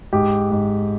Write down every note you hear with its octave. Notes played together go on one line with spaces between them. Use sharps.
G#2 G4
G#2